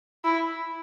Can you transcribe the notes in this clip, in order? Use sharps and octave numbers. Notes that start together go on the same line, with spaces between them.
E4